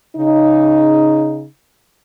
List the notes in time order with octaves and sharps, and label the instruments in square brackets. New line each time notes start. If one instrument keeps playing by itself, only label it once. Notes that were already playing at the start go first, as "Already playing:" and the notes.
[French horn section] C#3 D#4